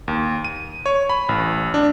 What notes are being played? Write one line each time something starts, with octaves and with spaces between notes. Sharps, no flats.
D#2
D#7
C#5
B5
A1
D4